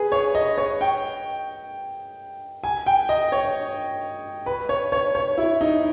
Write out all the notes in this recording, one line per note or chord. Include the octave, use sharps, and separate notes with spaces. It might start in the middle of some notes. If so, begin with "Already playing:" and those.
Already playing: G#4 B4
C#5
D#5
C#5
G5
G#5
G5
D#5
C#5
B4
C#5
C#5
C#5
E4
D#4